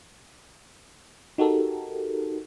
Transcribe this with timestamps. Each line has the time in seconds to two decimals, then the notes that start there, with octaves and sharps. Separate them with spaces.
1.38 D#4 F#4 G4 A4 A#4